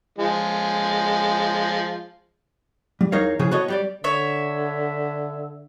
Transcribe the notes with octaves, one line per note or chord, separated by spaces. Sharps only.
F3 G#3
G3
E2 D#4 A#4 C#5 F5
C#3 E3 F3 G#4
B3 F#4 A4 C#5 D#5
G3 G4 D5
D3 C#5 E5